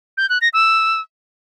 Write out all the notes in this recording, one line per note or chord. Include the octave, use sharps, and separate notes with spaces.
G6
F#6
A#6
E6